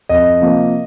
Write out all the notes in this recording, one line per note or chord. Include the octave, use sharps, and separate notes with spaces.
F2 D#5
C3 F3 A#3